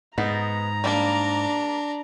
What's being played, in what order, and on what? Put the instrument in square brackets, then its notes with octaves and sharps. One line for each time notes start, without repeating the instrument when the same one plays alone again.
[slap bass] G#2 [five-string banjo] B3 D#4 [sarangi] A#5
[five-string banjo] G3 A3 A#3 [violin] D4